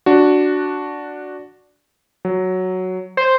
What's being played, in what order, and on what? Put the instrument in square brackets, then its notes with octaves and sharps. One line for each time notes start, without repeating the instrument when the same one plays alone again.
[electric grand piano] D4 F#4
F#3
[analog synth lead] C5